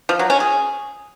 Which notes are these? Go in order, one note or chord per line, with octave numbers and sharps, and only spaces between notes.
F3
F#3
C#4
G#4